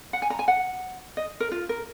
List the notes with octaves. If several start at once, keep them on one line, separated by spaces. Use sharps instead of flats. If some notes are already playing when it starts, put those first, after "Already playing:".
F#5
G#5
A#5
G#5
F#5
D#5
A#4
F4
A#4